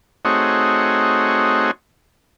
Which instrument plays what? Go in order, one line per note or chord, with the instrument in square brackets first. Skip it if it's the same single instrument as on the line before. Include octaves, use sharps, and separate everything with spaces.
[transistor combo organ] A3 C4 D#4 F#4 G#4 C#5